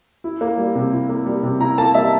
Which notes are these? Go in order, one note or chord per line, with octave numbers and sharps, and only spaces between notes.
E4
A#3
G3
C3
E4
A#3
G3
C3
E4 A#5
A#3 A5
G3 E5